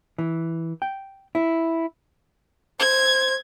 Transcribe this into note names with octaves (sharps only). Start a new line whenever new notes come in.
E3
G5
E4
C5 G#6